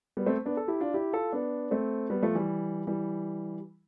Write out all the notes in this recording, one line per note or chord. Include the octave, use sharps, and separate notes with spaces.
G3 B3
A3 C4
B3 D4
A4
E4 G4
D4 F4
E4 G4
F4 A4
B3 D4
A3 C4
G3 B3
F3 A3
E3 G3
E3 G3